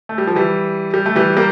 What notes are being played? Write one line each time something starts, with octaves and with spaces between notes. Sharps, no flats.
A3
G3
F3
E3 G3
G3
A3
E3 G3
G3 A#3